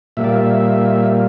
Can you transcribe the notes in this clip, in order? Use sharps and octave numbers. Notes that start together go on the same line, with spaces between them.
A#2 G3 A#3 E5
D5
E5